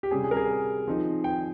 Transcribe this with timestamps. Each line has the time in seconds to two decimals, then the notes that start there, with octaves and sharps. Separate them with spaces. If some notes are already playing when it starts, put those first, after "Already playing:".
0.03 G4
0.11 C3 G3 C#4 G#4
0.24 G#4
0.31 A#4
0.37 G#4
0.87 F3 C4 D#4
1.24 G5